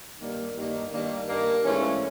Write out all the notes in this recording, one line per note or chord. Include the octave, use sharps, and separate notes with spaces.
G2 D#3 G3 A#3
G2 D#3 G3 A#3
G2 D#3 G3 A#3
G2 D#3 G3 A#3
G#2 E3 A3 C#4